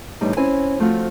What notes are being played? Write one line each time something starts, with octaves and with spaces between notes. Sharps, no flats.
E2 A2 G3 D4 D#4
C4 C#4 E4 C5 G#5
F3 A3 C4 F4 F#4